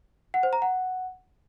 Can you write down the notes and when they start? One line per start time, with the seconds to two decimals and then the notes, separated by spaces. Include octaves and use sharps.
0.34 F#5
0.43 C5
0.53 A#5
0.62 F#5